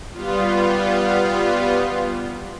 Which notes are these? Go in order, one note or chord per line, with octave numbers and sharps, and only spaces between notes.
G3 B3 F4